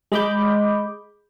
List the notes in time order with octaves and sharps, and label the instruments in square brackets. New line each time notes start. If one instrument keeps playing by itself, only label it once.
[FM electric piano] G#3 D#5 B5 D6 G6